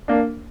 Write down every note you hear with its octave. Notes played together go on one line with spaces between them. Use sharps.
A#3 D4